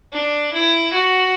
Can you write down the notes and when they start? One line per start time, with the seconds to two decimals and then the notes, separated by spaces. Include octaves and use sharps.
0.13 D4
0.53 E4
0.93 F#4